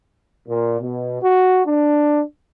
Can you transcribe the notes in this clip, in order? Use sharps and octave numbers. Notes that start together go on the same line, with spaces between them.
A#2
B2
F#4
D4